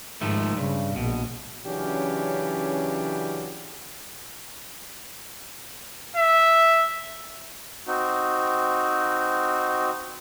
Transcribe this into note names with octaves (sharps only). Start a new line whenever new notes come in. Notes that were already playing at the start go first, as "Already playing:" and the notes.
G#2 D#3 F3 A3
G2 C#3
A#1 B2
C#3 E3 F#3 C#4 D4 G4
E5
C4 D#4 F#4